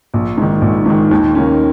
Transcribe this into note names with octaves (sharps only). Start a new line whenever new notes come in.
A#1
G#2 D#3
A#1
G#2 D#3
D#2
D#3 A#3 C#4